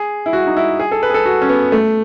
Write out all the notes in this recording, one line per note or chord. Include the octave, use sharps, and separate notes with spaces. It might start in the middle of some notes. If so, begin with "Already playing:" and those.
Already playing: G#4
E4
F#4
D#4
E4
G#4
A4
B4
G#4
A4
F#4
C#4
B3
A3